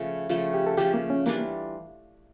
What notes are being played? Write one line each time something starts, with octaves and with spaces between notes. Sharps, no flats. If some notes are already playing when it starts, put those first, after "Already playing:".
Already playing: C#3 F3 A3
C#3 F3 A3 F4
G4
A4
C#3 F3 A3 G4
A#3
C#4
E3 G3 A#3 D4 F4